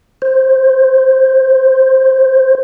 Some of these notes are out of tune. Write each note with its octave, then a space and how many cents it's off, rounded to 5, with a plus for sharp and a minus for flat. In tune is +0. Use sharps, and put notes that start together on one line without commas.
C5 +10